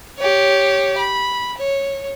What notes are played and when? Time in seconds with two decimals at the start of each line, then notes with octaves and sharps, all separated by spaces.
0.18 G4 C#5
0.98 B5
1.58 C#5